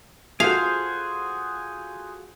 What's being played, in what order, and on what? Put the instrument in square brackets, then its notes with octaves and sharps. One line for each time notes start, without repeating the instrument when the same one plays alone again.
[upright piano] F4 F#4 A4 [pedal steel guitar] G#4 C5 [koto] F5